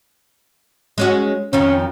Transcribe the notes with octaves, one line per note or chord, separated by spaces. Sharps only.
G#3 C#4 F#4
F2 D#3 F3 C#4